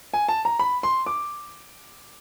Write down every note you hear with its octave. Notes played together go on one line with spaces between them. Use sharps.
G#5
A5
A#5
B5
C6
D6